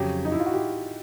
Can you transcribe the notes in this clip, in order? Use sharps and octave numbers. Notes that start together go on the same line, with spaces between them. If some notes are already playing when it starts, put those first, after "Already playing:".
Already playing: F2 C#3 F#3 G4
D#4
E4
F4
F#4
G4